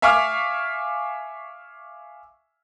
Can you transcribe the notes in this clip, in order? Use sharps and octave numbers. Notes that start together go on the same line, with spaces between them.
E5 F5 G#5 C#6 D6 F6